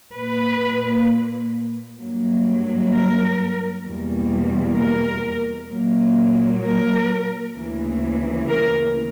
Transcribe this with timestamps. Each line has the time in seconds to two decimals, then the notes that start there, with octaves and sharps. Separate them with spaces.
0.14 A#2 A#3 B4
2.00 G2 F#3 A#3
2.93 A#4
3.85 E2 B2 G3 A#3
4.78 A#4
5.71 A#2 F#3 A#3
6.64 A#4
7.56 D2 C#3 E3 A#3
8.49 A#4